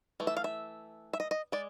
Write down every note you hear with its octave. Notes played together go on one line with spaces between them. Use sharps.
E3 A3
E5
F5
E5
E5
D#5
D#5
G#3 D5